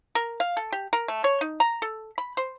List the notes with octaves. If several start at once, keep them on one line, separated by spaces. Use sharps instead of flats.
A#4
F5
A4
G4
A#4
A3
C#5
D#4
A#5
A4
B5
C5